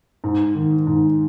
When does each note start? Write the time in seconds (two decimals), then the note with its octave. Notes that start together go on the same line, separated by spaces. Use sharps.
0.24 G#2
0.55 D#3
0.87 G#2